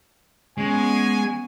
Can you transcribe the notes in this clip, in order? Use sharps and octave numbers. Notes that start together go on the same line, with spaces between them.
G#3 B3 C#4 G#5